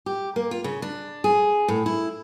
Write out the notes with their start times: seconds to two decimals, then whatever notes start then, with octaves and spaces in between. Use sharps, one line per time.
0.06 G4
0.36 A#3
0.51 F4
0.64 C#3
0.82 D4
1.24 G#4
1.68 A2
1.86 E4